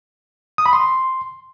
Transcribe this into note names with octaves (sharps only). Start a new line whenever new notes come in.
D#6
B5
C6